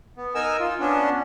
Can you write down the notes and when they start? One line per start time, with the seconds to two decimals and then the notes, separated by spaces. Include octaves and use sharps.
0.17 B3
0.35 D#4 A#4 G#5 E6
0.60 F4
0.80 B3 C#4 D4